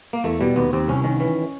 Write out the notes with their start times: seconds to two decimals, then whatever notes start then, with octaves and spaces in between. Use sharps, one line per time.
0.13 A#3
0.24 E2 A3
0.41 B2 G3
0.56 D#2 B3
0.73 D#2 C4
0.88 C2 C#4
1.04 D#3 C#4
1.20 E3 C#4